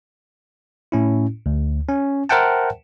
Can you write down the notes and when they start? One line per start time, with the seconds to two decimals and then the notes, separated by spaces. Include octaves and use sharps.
0.92 A2 C#4 E4
1.46 D2
1.88 C#4
2.29 A#4 C5 E5 F#5 G5 A5